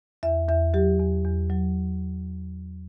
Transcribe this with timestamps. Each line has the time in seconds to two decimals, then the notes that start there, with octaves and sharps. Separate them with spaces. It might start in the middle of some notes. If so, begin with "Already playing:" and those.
0.23 E2 E5
0.48 E2 E5
0.74 F#3 G4
0.99 E2
1.24 E2
1.50 F#3